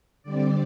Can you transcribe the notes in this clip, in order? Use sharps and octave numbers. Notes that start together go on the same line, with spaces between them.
D3 G3 C4 D5